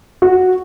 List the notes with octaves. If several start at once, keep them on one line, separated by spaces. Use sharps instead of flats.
F#4